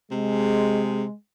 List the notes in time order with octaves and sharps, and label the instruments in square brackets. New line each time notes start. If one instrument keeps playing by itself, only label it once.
[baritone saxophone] C3 [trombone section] G#3